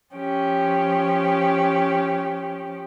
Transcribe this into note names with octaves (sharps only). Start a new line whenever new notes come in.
F3 C#4 G4